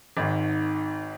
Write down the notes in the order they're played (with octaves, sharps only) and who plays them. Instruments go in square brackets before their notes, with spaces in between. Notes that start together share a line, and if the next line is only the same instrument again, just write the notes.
[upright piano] G#1 G#2 D#3